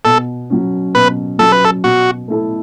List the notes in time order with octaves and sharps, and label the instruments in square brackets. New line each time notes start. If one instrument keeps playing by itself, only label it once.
[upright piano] B2 [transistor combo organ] A4
[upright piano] F#3 C#4
[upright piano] B2 [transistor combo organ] B4
[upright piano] F#3 C#4 [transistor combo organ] A4
[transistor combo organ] B4
A4
[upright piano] B2 [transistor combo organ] F#4
[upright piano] A3 E4 A4